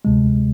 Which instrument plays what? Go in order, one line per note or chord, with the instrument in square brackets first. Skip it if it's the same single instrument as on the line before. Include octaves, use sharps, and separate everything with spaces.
[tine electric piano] D2 C3 G#3